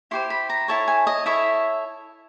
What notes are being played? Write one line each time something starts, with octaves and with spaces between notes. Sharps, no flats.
E4 G4 C5 C6
B5
A#5
E4 A4 C#5 A5
G#5
D#5
E4 A4 C#5 E5